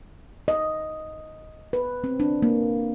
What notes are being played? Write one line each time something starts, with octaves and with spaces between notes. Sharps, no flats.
D#5
B4
C4
D4
A#3